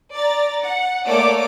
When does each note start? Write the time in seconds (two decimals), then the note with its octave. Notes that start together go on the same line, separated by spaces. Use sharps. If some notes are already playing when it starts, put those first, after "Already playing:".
0.14 D5 A#5 A6
0.63 F#5
1.05 A3 A#3 C#5 D5 D6 D7